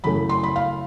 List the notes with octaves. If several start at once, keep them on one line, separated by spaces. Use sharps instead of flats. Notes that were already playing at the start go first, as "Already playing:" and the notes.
F#2 C#3 E3 A3 B5
C6
B5
F5